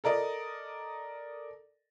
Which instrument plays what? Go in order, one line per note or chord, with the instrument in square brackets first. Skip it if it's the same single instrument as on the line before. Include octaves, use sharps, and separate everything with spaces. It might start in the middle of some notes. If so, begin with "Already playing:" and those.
[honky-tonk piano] A4 A#4 D5 D#5